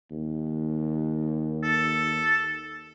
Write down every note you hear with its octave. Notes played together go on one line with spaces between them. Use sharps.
D#2
A4